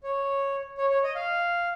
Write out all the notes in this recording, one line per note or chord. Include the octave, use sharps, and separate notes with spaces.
C#5
C#5
C#5
D#5
F5